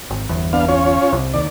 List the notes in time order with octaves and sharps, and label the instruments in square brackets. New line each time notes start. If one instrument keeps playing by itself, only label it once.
[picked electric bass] G#1
G1 E2
[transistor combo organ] B3 D4 F5
C#4 F4 C#5
[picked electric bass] C2
[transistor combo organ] D#2 D5